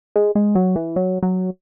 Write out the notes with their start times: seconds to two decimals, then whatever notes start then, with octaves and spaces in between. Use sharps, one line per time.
0.16 G#3
0.35 G#3
0.55 F#3
0.76 E3
0.96 F#3
1.23 F#3